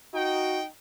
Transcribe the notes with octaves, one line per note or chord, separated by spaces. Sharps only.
D#4 F#4 G5